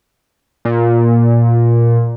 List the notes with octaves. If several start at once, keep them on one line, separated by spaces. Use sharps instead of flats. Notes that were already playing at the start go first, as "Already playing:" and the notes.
A#2